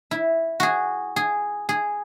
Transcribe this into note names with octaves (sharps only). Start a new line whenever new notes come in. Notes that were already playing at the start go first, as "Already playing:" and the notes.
E4
F#4 G#4
G#4
G#4